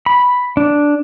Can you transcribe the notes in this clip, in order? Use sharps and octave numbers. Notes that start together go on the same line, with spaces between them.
B5
D4